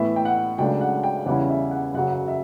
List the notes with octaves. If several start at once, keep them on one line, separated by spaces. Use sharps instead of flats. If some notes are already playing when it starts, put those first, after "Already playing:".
Already playing: A2 E3 B3 E5
G5
F#5
C#2 C#3 F#3 A3 D4 G5
F#5
G5
E2 C#3 G3 C#4 E4 F#5
E5
F#5
F#2 C#3 F#3 F#5
F#5
E5